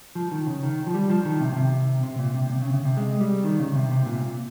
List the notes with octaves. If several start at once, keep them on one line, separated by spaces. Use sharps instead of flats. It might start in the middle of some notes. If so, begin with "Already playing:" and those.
F3
D#3
C#3
D#3
F3
G3
F3
D#3
C3
A#2
C3
C3
A#2
C3
C3
C#3
C#3
C3
G#3
G3
D#3
C#3
C3
C3
A#2
A#2